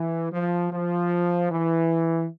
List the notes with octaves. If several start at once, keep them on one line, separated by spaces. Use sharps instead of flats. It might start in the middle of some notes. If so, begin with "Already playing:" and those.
Already playing: E3
F3
F3
E3